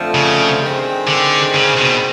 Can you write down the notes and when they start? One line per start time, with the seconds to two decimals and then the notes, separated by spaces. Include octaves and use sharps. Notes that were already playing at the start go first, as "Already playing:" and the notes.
Already playing: F2 D3 F3 A3
0.14 C#3
0.61 G2 D#3 G#3 C4
1.07 D3
1.54 C#3
1.77 B2